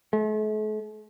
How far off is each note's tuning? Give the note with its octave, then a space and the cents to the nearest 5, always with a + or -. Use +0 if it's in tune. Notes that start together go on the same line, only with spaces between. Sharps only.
A3 -45